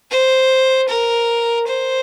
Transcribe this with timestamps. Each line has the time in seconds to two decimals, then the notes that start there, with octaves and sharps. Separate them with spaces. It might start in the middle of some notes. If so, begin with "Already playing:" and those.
0.11 C5
0.88 A#4
1.67 C5